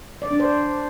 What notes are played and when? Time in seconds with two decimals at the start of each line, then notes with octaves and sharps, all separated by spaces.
0.22 D5
0.31 D4
0.40 C5